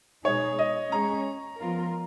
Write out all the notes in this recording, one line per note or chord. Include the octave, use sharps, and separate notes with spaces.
B2 G#3 D#4 G#4 C#5
D#5
G#3 C#4 G#4 C#5 A#5
F3 B3 F4 A#4